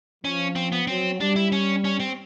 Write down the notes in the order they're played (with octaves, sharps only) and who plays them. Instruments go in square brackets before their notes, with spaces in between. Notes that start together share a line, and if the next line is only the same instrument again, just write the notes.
[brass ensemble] F3 [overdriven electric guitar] C#4
[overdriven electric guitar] C4
B3
[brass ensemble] F#3 [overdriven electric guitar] C4
[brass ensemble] G3 [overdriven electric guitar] D4
[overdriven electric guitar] E4
C#4
C#4
C4